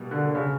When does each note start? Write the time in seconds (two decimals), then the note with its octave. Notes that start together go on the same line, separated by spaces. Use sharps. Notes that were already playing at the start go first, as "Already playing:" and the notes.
Already playing: B2 G3 A#3
0.11 D3
0.25 D3
0.35 C#3